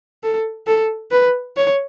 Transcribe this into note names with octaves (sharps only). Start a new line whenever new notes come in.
A4
A4
B4
C#5